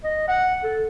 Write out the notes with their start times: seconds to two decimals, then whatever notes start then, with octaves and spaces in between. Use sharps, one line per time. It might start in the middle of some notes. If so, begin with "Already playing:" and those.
0.04 D#5
0.28 F#5
0.64 A4